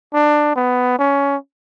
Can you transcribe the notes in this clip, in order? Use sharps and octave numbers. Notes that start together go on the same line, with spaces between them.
D4
B3
C#4